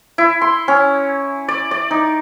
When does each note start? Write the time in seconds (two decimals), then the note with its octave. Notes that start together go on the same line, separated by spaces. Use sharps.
0.18 E4
0.42 C6
0.68 C#4
1.49 D5
1.71 D5
1.91 D#4